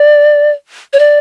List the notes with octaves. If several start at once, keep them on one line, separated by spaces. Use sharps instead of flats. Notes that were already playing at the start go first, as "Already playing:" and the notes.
Already playing: D5
C#5
D5